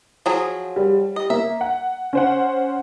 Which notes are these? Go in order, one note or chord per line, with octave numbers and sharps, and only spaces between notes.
F3 F#3 G#4
G3
D#5
A#3 E5
F#5
C#4 C5 F#5